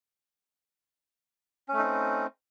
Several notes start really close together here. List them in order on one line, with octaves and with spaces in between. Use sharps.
C#4 A3 D#4 C4